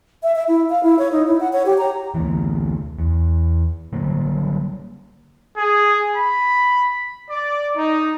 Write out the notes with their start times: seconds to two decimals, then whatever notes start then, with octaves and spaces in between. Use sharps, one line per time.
0.23 E5
0.36 E5
0.48 E4
0.70 F5
0.83 E4
0.99 C#5
1.12 D#4
1.27 E4
1.40 F#5
1.53 C#5
1.66 G4
1.78 A#5
2.15 D2 E3
2.99 E2
3.93 D3 F#3 G3 A#3
5.57 G#4
6.17 B5
7.30 D5
7.77 D#4